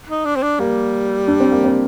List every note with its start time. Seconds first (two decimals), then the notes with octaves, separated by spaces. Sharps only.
0.09 D#4
0.25 D4
0.36 C4
0.43 D4
0.60 G3 A#3
1.28 D4
1.40 C4
1.52 A#3
1.64 C4